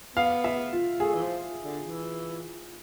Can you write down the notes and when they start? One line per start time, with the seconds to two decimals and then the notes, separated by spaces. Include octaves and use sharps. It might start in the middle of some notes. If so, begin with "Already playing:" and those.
0.17 B3 F5
0.44 E5
0.73 F4
1.00 A3 G#4
1.15 E3
1.22 F3
1.63 D3
1.84 E3